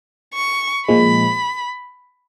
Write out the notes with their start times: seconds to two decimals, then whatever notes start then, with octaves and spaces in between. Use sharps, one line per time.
0.34 C#6
0.88 A#2 F3 G#3 B5